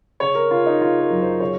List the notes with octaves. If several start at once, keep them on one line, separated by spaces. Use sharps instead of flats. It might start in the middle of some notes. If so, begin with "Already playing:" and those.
C#3 C#5
A#4
C#3 F4
D#4
C#3 F4
A#4
F#2
C5
C#3 C#5